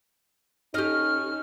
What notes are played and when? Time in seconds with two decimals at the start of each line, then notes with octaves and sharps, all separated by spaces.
0.74 C#4 D#4 G4 A4 D#5 F6